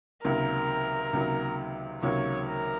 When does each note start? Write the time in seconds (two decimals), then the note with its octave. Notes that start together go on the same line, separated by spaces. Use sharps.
0.24 C#2 C3 D#3 F#3 A#3 A#4
1.13 C#2 C3 D#3 F#3 A#3
2.03 C#2 C3 D#3 F#3 A#3 C#5
2.47 A#4